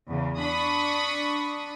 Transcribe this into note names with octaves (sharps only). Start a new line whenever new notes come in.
E2 C#3
D4 B5 C#6 D#6